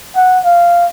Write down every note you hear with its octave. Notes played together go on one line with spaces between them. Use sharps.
F#5
F5